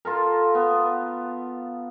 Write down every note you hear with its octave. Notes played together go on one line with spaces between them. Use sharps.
F4 A4 A#4
B3